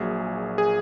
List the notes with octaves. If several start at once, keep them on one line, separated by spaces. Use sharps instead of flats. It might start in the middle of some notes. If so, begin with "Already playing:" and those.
Already playing: A#1 A#2 F#3 G#4
G#4